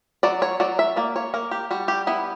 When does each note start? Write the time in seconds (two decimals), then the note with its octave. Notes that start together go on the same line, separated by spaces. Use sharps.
0.23 F#3 D5
0.42 C#5
0.60 F#3 D5
0.79 E5
0.96 A#3 D5
1.16 C#5
1.34 A#3 A#4
1.51 G4
1.71 G3 F#4
1.88 G4
2.07 B3 E4